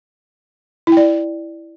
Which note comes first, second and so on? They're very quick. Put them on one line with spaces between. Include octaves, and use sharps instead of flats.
E4 G5 D5